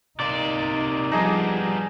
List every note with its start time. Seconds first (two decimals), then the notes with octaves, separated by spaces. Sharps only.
0.20 C3 A#3 D#4 D5
1.12 F3 G3 B3 D4 D#4 G#4 A#5